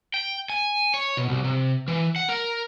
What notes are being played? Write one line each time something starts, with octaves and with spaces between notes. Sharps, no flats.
G5
G#5
C#5
B2
C2
C3
E3
F#5
A#4